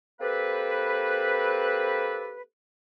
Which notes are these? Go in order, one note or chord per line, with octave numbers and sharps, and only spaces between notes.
A#3 C4 G4 A4 B4